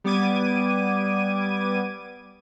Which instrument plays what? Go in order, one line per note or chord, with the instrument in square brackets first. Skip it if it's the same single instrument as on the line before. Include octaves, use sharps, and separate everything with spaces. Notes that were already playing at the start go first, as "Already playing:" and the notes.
[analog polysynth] G3 B3 D6 G#6 D#7